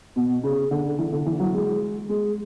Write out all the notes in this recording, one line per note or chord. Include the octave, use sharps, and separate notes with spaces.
B2
C#3
D3
E3
D3
E3
F#3
G#3
G#3